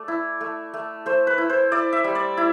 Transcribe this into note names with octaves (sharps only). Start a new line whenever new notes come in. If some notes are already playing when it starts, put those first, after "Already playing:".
Already playing: A3 D5
E4
A3
A3
A3 C5
B4
E4
C5
E4 D5
E5
G3
D5
E4